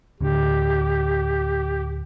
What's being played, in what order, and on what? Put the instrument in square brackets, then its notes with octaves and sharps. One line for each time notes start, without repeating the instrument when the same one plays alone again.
[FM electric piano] D2 A2 D3 [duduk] G4